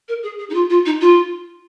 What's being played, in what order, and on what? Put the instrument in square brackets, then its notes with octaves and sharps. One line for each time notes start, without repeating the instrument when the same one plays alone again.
[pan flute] A#4
G#4
G#4
D#4
F4
F4
D#4
F4